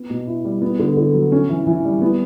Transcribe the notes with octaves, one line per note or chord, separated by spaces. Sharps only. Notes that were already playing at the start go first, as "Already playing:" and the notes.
Already playing: B3
B2
E4
G3
B3
D3
D3
F#3
C#4
E3
E3
G3
B3